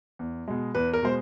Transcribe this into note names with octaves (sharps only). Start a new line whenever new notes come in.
E2
B2 G#3
E2 B4
A#4
B2 G#3 C5